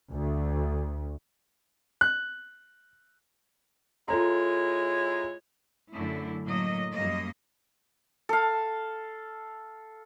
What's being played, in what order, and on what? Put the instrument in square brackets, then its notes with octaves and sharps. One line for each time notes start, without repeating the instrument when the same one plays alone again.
[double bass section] D2
[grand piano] F#6
[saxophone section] G#3 E4 C#5 [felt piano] F4 A4 A#5
[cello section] F#2 D3 A3 E4
A2 F#3 A#3 D#5
F#2 G3 A#3 D#5
[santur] A4 F5